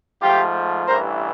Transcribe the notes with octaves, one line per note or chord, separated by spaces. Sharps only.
G#2 F3 A3 F4 G4
A1 G2 E3 A#4 C5